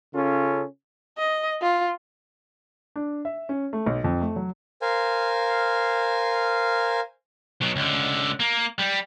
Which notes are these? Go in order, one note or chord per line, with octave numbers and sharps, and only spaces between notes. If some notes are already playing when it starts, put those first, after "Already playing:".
C#3 C#4 F4 A4
D#5
F4
D4
E5
C#4
A3
B1
F2
A3
F#3
A#4 C5 F5 G#5
B2 F#3
C#2 D3
A#3
G3